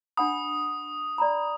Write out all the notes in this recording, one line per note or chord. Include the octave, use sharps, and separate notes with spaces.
D4 F#5 B5 D#6
D5 A#5 B5